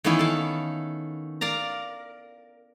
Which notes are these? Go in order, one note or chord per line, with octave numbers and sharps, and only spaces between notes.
D#3 E3 A#3 B3 C#4 E4
A4 F5
A#4 D5 F5 A#5